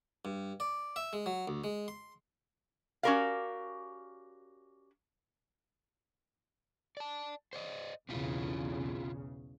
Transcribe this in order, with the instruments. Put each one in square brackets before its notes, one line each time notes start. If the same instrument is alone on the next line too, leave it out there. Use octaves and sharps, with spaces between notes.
[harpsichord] G2
D5
E5
G#3
F#3
D2
G#3
C6
[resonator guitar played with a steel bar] C#4 F#4 G4 A#4 D5 F5
[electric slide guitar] D5 A5
C5 D5 D#5
[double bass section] B1 E2 C#3 [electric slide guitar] C4 E4 F4